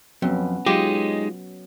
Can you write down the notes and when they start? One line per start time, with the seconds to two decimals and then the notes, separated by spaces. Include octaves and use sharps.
0.22 F2 F#3 B3 C#4
0.66 F#3 G#3 D#4 F4 G4